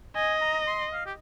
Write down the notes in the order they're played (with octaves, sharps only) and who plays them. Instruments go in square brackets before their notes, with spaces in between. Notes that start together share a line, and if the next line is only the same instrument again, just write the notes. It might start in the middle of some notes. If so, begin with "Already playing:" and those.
[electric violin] D#5 [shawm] G#5
[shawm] A#5
C6
F5
G4